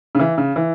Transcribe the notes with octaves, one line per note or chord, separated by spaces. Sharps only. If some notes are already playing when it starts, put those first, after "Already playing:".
C#3
E3
C#3
E3